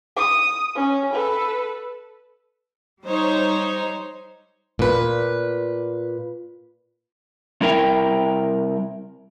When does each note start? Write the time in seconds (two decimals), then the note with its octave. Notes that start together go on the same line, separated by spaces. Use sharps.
0.17 D#6
0.75 C#4
1.12 A4 B4
3.04 G3 D#4 C5 C#5
4.79 A#2 B4
7.61 C3 G3 E4 A#4 E5 G5